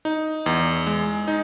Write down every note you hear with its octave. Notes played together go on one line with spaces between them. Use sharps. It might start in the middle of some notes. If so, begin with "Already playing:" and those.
D#4
E2
G#3
D#4